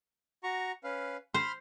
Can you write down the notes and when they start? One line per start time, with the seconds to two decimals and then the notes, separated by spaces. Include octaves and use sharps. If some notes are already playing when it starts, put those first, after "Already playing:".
0.44 F#4 A#5 C#6
0.84 C#4 B4 F5
1.34 C5 B5 C6 F6